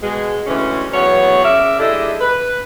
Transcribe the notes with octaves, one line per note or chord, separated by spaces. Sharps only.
B2 G#3
D2 E3 G#3 C#4
E2 A2 F#3 B3 C#5 F#5
C#3 A#4 D5 E5
G#3 D4 E4 G4 A4 D#5
B4